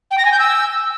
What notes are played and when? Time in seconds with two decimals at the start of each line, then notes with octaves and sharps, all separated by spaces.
0.11 G5
0.18 A#6
0.25 G#5
0.32 G6
0.39 E6